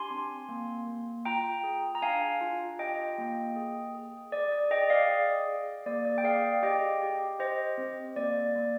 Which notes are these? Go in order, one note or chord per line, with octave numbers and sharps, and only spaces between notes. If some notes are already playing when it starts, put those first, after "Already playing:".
Already playing: D4 G4 G#5 C6
C4
A#3
A#3
F4 G5 A#5
G#4
A#5
D4 F5 G#5
F4
G4 D#5 G5
A#3
G#4
G#4
G#4 D5
D5
G#4 D#5 G5
D5 F5
G#4
G#4
A#3 D5
D5
G5
G#4 D5 F5
G4 D#5 G5
G4
G4 C5 D#5
C4
A#3 D5
A#3